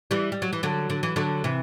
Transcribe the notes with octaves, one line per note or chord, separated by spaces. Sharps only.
E3 G3
G3
F#3
E3
D3 F#3
D3
E3
D3 F#3
C3 E3